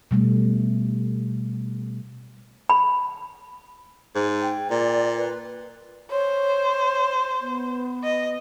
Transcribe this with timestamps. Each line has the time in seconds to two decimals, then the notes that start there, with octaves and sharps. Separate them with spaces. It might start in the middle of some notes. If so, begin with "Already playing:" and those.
0.11 B2 G3 A3
2.70 B5
4.15 G#2
4.42 G5
4.71 A#2 D5
5.17 B4
6.11 C5 C#5
7.41 B3
8.04 D#5